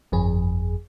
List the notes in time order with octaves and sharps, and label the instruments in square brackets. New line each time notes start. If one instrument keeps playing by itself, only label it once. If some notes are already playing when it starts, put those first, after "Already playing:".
[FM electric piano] G1 F2 G#4